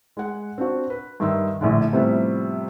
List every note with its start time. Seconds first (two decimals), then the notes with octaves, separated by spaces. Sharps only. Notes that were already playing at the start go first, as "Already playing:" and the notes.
0.17 G#3 F#5
0.58 C4 D4 F#4
0.90 B4
1.20 G2 D#3 E5 C6 E6
1.61 A#1 A2 D3
1.92 A2 C3 F3 G3 B3